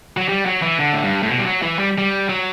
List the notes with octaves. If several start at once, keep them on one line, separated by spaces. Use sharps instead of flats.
F#3
G3
F#3
E3
D3
A2
G2
A2
B2
G3
F#3
E3
G3
G3
F#3